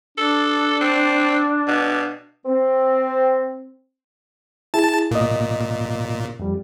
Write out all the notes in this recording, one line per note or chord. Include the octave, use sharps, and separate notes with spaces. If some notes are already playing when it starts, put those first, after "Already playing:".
D4 A4
C4
B2
C4
E4 G#4 A5
A#2 A#3 D#5
F2 G3